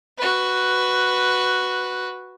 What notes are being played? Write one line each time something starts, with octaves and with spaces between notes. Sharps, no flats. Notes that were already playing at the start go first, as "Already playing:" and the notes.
F#4 B4